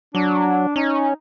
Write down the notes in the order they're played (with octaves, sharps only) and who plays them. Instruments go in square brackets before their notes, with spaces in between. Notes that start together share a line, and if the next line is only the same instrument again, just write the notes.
[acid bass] F#3 [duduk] D4
[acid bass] C#4 [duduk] D#4